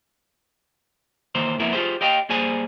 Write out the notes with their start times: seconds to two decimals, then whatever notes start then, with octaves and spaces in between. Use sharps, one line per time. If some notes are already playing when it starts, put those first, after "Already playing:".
1.35 D#3 E3 A#3 C5
1.59 F2 A#3 B3 E4 A#4 E5
1.73 F4 G4 G#4 C5
2.01 G4 D#5 F5 G5
2.29 G3 A#3 G#4 C5 G#5